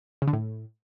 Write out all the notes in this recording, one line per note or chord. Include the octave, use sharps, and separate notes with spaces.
C#3
D3
A2